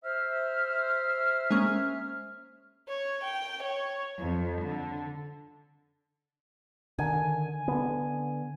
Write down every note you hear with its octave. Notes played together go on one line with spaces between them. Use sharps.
C5 E5 F6
G#3 A#3 C#4
C#5
G5
C#5
F2
D3
D3 D#3 G#5
D3 B3